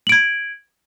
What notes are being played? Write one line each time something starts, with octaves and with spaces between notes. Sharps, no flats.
G#6 D7 F#7